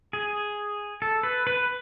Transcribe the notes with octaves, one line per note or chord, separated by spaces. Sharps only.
G#4
A4
B4
B4